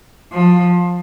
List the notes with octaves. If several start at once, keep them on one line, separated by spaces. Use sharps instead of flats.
F3